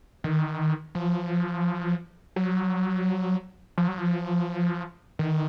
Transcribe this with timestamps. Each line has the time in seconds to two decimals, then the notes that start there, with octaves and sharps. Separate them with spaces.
0.24 D#3
0.95 F3
2.36 F#3
3.78 F3
3.88 F#3
3.98 F3
5.19 D#3